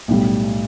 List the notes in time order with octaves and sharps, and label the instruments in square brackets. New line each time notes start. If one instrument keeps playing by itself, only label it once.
[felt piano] B1 A2 G3